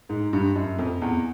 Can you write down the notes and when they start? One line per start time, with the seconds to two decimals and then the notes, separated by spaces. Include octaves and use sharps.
0.09 G#2
0.33 G2
0.56 F#2
0.79 F2
1.02 E2